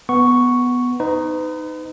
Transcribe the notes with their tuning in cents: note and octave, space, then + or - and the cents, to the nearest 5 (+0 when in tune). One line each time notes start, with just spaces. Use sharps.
B3 +0 C#6 +0
D#4 +0 B4 +40